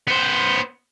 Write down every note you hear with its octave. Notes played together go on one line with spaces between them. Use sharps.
B3 C5